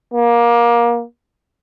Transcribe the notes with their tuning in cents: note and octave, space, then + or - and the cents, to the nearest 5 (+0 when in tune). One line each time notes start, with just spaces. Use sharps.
A#3 +20